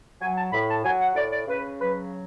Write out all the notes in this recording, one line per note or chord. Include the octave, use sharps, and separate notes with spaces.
F#3 G#5
A5
A2 B5
A5
F#3 G#5
F#5
A2 D5
D5
C#3 B4
F#3 B4